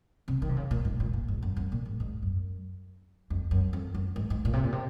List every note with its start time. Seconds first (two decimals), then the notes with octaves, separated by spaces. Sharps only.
0.28 C3
0.42 D#3
0.49 C3
0.57 C#3
0.71 A#2
0.85 G#2
1.00 A#2
1.13 A#2
1.28 G#2
1.42 F#2
1.56 F#2
1.72 A#2
1.85 G#2
2.00 G#2
2.22 F#2
3.30 F2
3.51 F#2
3.73 F2
3.94 F#2
4.16 G#2
4.30 G#2
4.45 A#2
4.53 C3
4.63 A#2
4.72 C3